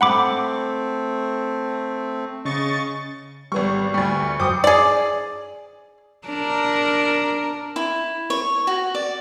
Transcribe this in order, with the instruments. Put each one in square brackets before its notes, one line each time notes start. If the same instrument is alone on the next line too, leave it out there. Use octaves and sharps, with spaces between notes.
[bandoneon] A3 C4 [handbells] F#5 B5 D6
[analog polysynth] C#3 C#6 A6 [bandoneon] D#5
[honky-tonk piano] G#1 B3 C#6 [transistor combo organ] G3
[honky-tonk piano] D2 G3 [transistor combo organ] C#6
[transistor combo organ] F#2 C5 G5 [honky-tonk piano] D6 D#6 C#7
[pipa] G#4 D5
[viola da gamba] D4 A#4
[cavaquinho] E4
C#5
F#4
D5